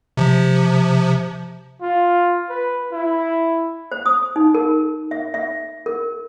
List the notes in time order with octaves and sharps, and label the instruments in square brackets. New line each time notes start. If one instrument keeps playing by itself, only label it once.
[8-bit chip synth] C3 F3
[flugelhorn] F4
B4
E4
[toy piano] C5
D#6
D#4
A#4
E5
E5
A#4